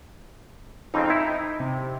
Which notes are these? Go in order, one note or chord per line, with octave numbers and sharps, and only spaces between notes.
F2 C#3 C4 D#4
E4
C3